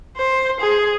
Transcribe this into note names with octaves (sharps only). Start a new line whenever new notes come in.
C5
G#4